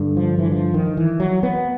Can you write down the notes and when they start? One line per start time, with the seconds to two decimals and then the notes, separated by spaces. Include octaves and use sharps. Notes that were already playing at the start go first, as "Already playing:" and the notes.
Already playing: G2 D3
0.17 F3
0.39 E3
0.52 F3
0.74 D#3
0.97 E3
1.20 F#3
1.43 B3